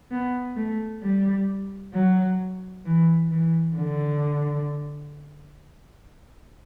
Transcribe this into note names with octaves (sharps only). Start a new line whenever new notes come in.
B3
A3
G3
F#3
E3
E3
D3